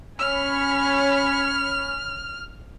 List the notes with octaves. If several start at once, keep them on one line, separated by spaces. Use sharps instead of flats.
C#4 C#5 B5 F6